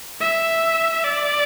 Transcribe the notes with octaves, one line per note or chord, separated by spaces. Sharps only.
E5
D5